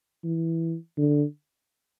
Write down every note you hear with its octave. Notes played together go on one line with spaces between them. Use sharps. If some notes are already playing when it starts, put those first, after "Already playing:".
E3
D3